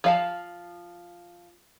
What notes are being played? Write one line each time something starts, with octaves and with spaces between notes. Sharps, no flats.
F3 F5 A5